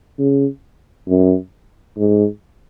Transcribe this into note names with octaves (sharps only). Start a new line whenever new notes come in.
C#3
F#2
G#2